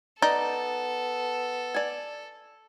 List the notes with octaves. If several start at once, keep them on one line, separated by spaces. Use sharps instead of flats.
B3 D#4 A4 D5
D5 G#5